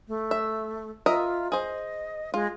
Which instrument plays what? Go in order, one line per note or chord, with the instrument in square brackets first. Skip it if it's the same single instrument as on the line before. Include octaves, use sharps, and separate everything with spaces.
[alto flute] A3
[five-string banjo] E5
[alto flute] F4 [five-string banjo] A#4 D#5 E5
[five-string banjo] G#4 C5 [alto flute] D#5
[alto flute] G#3 [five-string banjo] F4